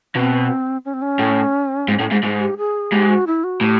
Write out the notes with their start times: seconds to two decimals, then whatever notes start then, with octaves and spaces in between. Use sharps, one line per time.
0.15 B2 C4
0.85 C#4
0.94 C4
1.02 C#4
1.19 A2
1.88 G#2
2.00 A2
2.11 G#2
2.23 G#2
2.40 G4
2.57 G#4
2.92 G#2 G4
3.09 F#4
3.27 E4
3.44 F#4
3.61 A2 G4